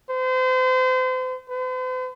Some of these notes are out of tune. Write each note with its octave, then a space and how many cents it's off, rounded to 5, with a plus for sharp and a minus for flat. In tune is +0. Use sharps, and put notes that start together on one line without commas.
C5 -35
C5 -45